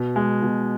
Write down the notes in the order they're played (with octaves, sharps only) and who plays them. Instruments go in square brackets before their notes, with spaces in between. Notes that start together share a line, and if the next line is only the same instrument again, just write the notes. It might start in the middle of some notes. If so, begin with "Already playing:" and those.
Already playing: [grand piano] B2
G#3
B2